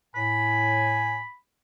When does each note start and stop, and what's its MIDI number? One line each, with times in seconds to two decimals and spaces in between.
0.15 1.22 45
0.15 1.21 80
0.15 1.35 83